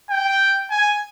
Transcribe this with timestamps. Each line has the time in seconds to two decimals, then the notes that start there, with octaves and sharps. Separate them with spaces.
0.10 G5
0.71 G#5